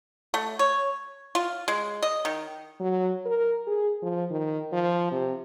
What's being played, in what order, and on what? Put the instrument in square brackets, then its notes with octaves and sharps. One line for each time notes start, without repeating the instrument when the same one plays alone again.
[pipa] A3
C#5
F4
G#3
D#5
D#3
[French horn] F#3
A#4
G#4
F3
D#3
F3
C3